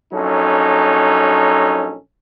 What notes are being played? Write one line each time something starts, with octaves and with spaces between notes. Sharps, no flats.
A#1 F#3 C#4 D#4 A4